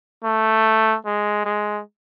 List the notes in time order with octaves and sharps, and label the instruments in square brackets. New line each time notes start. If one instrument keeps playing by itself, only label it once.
[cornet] A3
G#3
G#3